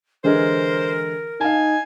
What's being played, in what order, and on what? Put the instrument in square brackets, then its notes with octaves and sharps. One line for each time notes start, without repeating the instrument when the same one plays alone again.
[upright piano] D3 E3 G#3 [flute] A#4 [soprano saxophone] C5
[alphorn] D#4 [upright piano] F5 A5 [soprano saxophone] G#5